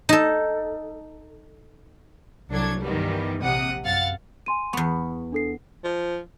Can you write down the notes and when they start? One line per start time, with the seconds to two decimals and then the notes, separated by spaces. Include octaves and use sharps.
0.09 D#4 A4
2.50 C2 F#3 D4 A4 G#6
2.82 G2 D#3 E3 G3 B3
3.42 A#1 C3 F#5 D#6
3.84 F#2 F5 F#5 A6
4.46 G#5 C6 D#7
4.73 E2 B3 C#6
5.32 D4 A4 C7
5.84 F3